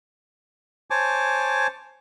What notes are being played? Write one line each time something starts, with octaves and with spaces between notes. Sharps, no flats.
C5 C#5 G#5 A5 D6